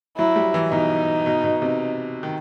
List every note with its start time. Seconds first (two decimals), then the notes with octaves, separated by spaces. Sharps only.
0.17 F#3 E4
0.36 G3
0.54 E3
0.72 B2 D#4
1.26 B2
1.44 B2
1.62 C3
2.23 D#3